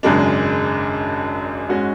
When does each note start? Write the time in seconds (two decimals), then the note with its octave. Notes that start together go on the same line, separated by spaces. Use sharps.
0.03 G#1 F#2 C#3 G#3 D4
1.69 G#2 G#3 C#4 F#4